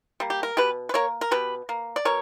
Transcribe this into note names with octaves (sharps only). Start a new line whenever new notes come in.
G3 A#3
G4
A#4
B2 G4 B4
B4
A#3 A#4 C#5
A#4
B2 G4 B4
A#3
D5
B2 A#4 C#5